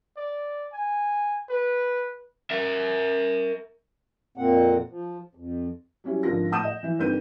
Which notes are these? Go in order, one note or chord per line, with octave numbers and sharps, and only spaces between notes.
D5
G#5
B4
A#4 E5
F2 A#2 A#3 C4 F#5
F3
F2
F#3 G3 C#4 E4
G#1 D3 F3 F4 A#6
A2 F#5 A5 D#6 G6 E7
D#5
E3 E4
G1 D#3 C4 B4 G6 D#7